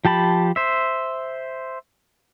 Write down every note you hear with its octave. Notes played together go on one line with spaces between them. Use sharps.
F3 G4 A5 B5
C5 E5